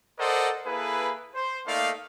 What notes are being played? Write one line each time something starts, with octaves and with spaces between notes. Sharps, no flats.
A4 A#4 C5 D5 D#5 F#5
A#3 E4 G#4 A4 B4
C5
A3 A#3 D#4 D5 F5